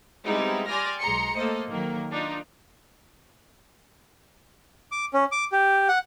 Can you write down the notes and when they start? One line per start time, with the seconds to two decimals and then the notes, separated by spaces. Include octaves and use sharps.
0.25 G3 G#3 B3 C4 D#4 E4
0.67 D5 G5 G#5 C6 F6 A#6
1.00 B1 G#3 A#5 C6 C#7
1.36 A3 A#3 A4 C5 D#5
1.69 D#3 F#3 A#3 A#4
2.12 D4 D#4 F4
4.92 D6
5.14 C#4
5.32 D6
5.52 G4
5.89 F#5